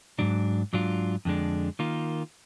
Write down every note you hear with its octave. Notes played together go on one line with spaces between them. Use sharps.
G#2 F#3 D4
G#2 F#3 D4 F4
F2 D3 G#3 D4
D#3 A#3 F4